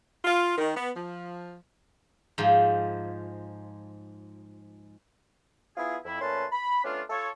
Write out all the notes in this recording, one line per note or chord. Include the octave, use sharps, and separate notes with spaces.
F4
D#3
B3
F3
G#2 F3
B3 E4 F4 G#4
F2 E4
A#2 A3 C#4 B4 A5 C6
B5
A3 B3 C#4 D4 F4
F4 A4 C#5